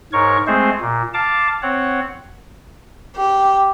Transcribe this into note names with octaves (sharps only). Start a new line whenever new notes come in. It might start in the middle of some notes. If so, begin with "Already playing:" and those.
G#2 A#4 C#5 C#6
G#3 A3 C4 G#4 C5
A#2
F5 A5 D6
C4 C#5 F#5
G4